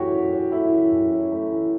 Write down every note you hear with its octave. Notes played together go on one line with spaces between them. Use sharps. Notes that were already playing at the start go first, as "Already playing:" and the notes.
Already playing: F#2 E3 A3 C#4 F#4 G4 C#5
F#2
C#4
A3 E4
E3
F#2
C#4
A3
E3